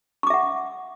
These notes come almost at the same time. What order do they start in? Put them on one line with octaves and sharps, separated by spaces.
C#6 D6 E5 F#5